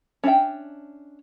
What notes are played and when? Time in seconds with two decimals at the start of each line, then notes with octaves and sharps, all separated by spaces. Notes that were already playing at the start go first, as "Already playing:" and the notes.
0.24 C#4 D4 D5 E5 G5